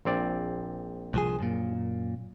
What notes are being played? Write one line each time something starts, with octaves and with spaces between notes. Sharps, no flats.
A#1 C4 D5
C2 F3 G#4
F#2 A#2